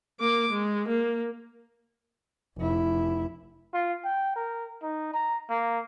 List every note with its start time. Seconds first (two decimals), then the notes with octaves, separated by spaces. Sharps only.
0.20 A#3 D6
0.52 G#3
0.88 A#3
2.57 F1 E4
3.74 F4
4.05 G5
4.36 A#4
4.83 D#4
5.14 A#5
5.50 A#3